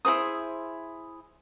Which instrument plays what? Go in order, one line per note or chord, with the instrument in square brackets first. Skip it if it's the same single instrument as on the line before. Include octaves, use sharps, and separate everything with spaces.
[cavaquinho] E4 G#4 C5 D#6